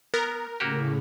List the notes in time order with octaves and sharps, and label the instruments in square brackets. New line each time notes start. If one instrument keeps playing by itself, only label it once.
[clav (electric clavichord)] B3 [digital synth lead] A#4
[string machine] A2 C#3 [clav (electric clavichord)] A#3 F#4 G4